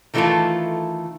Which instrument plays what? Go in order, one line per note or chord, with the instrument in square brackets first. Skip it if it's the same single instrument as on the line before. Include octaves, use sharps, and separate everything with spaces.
[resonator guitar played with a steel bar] D#3 E3 A3 C#4 F4 A4